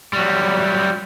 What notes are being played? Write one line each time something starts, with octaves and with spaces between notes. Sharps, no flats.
F#3 G3